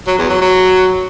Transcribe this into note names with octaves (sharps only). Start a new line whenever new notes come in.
F#3
E2
F#3
F#3